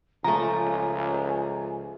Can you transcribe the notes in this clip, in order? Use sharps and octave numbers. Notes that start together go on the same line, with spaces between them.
C#2 F3 A3 G#5 A#5